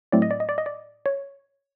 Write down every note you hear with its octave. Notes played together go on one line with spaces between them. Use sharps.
A2 F#3 A3 C4 D5
D#5
D5
D#5
D5
D#5
D5
C#5